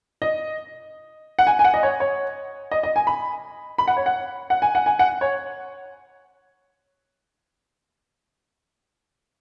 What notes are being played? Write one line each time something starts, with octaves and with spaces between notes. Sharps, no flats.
D#5
F#5
G#5
G#5
F#5
D#5
C#5
C#5
D#5
D#5
G#5
B5
B5
F#5
C#5
F#5
F#5
G#5
F#5
G#5
F#5
C#5